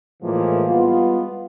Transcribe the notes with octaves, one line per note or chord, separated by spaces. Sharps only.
A2 E3 F3 G#3 A#3
G3 G#3 B3 F4